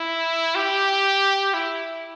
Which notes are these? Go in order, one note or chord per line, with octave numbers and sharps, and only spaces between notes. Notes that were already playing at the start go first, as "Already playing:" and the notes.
Already playing: E4
G4
E4